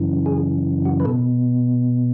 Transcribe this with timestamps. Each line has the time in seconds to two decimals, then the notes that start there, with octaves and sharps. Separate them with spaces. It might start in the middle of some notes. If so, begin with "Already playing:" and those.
Already playing: F#2 C#3 E3
0.26 G#4
0.85 F#4
1.00 B4
1.05 B2 A4